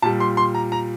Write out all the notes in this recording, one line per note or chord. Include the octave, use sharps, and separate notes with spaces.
A#2 G3 A5
C6
C6
A#5
A#5